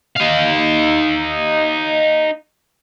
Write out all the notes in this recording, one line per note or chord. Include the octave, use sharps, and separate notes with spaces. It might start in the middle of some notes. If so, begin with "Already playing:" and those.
D#4 F5